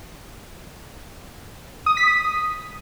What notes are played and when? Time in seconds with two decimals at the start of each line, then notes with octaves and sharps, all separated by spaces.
1.86 D#6
1.97 B6
2.08 D#6